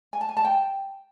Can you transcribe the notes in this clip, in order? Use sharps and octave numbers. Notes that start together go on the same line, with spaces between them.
G#5
A5
G#5
A5
G5